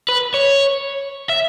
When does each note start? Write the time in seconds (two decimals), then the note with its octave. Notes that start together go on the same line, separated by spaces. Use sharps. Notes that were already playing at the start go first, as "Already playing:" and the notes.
0.09 B4
0.34 C#5
1.29 E5